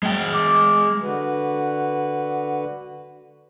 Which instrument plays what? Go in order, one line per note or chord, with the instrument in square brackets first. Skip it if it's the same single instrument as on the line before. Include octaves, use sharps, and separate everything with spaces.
[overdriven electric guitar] G#3 G5
[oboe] D6
[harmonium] D3 F#4 B4